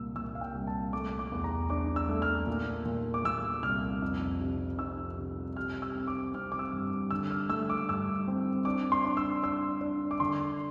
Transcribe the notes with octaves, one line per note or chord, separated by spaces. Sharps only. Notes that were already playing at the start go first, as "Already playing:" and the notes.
Already playing: C2 A#2 E6
A#2 E6
F5
G5
C2
A5
A3 D6
D6
E2
A#5
D4 D6
E6
A3
F6
A#2
A#2
D6
A#2 E6
C2 F6
F2
C3
F2 E6
C3
G3 F6
E6
C4
D6
C4 F6
D6
E6
G2
D3 E6
F6
A3 E6
D6
G2 E6
C4
D4 D6
C6
D4
E6
D4 E6
D4
D6
D3 C6